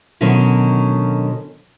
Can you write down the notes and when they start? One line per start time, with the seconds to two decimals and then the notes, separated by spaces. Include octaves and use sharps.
0.21 B2 D3 D#3 F#3 C#4